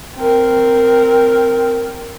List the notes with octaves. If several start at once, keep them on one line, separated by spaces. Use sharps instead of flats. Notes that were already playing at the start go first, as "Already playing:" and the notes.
C4 A#4